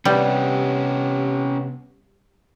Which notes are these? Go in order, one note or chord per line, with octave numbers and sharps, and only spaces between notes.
C3 G3 B3 C#4 G4